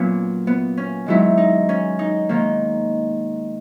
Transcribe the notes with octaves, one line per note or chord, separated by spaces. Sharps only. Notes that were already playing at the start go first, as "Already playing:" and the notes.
Already playing: A#2 F#3 B3 C#4
B3
C#4
G#2 D#3 F#3 B3 E4
D#4
C#4
D#4
G#2 D#3 A#3